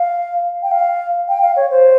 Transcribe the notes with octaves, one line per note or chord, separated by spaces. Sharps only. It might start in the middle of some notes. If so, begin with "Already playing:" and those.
Already playing: F5
G5
F5
G5
F5
C#5
C5